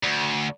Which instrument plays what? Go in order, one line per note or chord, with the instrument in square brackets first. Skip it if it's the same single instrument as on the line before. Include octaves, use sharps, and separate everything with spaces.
[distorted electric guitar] D2